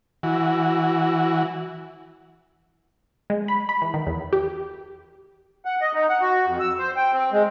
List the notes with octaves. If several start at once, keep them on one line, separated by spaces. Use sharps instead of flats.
E3 F#4
G#3
B5
B5
E3
D#3
E2
G4
F#5
D#5
D#4
F#5
F#4
F2
E6
C5
G5
C4
G#3